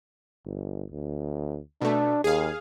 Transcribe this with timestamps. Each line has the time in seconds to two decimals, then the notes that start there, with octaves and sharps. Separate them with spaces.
0.46 G1
0.91 D2
1.81 B2 A3 D4
2.24 D#2 G#4 F5